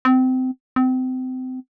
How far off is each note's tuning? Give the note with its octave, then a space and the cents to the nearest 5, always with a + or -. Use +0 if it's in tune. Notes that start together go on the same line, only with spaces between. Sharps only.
C4 -25
C4 -30